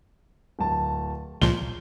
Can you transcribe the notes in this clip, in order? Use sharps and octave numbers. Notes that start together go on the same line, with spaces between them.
D1 A5
C#2 A#2 F3 G7